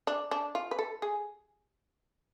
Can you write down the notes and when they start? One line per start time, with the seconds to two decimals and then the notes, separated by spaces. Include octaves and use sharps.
0.07 D4
0.31 D4
0.55 F4
0.71 B4
0.79 A4
1.02 G#4